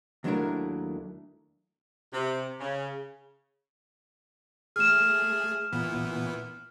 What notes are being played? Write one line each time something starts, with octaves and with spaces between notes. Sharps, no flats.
D#2 F#3 A3 D4 E4 A#4
C3
C#3
A3 G#4 F6 E7
A#2 E3 B3